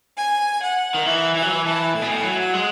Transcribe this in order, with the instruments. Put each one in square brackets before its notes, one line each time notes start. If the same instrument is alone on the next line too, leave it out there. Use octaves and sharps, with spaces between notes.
[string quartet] G#5
F#5
[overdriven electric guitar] D#3
[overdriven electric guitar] E3 [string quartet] E5
[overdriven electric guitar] E3 [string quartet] G#5
[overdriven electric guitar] F#3
E3
[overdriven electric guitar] E3 [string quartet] A5
[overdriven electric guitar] A2 [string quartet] G#5
[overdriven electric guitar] B2
A2
F#3
[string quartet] F#5
[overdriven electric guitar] G#3